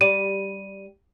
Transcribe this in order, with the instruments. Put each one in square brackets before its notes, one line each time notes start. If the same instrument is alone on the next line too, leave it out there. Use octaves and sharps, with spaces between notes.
[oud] G3 D5 [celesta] D#7